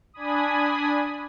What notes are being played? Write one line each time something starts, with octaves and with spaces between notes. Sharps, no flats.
D4 G#5 B5 D#6